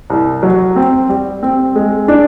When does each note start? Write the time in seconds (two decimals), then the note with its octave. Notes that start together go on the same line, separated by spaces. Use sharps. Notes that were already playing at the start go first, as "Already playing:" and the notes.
0.10 C2
0.43 F#3
0.76 C4
1.09 G3
1.43 C4
1.75 G#3
2.08 D4